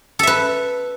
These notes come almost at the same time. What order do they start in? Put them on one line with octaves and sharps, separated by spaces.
A4 E5 B4